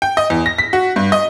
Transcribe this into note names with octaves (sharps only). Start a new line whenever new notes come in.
G5
D#5
E2
A#6
B6
F#4
G2
D#5